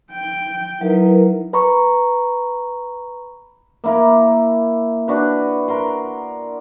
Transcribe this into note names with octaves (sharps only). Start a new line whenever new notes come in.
G5
F#3 D#4 E4 A#4 B4
B4 A#5 B5 C#6
A#3 E4 A#4
D4 F#4 B4
A#4 C6